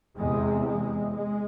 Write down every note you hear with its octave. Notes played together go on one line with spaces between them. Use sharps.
E2 C3 G#3
G#3
G#3